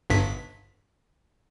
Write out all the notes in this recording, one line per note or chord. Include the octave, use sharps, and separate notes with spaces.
G1 G2 B6